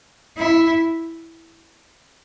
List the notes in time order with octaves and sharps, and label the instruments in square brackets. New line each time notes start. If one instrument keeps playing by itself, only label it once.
[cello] E4